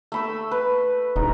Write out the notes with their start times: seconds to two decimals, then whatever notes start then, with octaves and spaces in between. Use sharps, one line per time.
0.12 A3 B5 E6
0.51 B4
1.16 E1 D#4